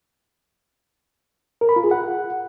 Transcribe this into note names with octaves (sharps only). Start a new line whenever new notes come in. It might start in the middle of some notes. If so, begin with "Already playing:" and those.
A#4
B5
F4
G#4
F#5